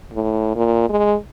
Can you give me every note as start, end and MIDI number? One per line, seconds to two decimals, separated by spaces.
0.14 0.55 45
0.56 0.89 46
0.90 1.15 56